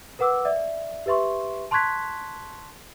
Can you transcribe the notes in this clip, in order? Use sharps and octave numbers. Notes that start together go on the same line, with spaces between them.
A#4 B4 F#5 D6 E6
D5 E5
G4 B4 E5 C6 C#6
A5 C6 C#6 F#6 G#6 B6